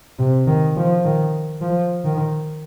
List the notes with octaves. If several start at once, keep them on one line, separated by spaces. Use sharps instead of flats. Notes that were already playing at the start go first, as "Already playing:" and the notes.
C3
D#3
F3
D#3
F3
D#3